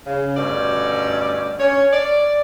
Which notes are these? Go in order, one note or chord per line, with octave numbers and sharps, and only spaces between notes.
C#3
D2 G2 B2 D3 C#4 D5
C#4 C#5
D5